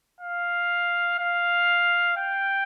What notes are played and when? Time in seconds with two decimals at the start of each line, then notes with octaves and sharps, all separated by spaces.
0.21 F5
1.19 F5
2.17 G5